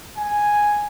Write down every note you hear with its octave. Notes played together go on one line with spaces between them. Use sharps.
G#5